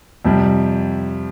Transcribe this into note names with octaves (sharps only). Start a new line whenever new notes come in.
F2 C3 G3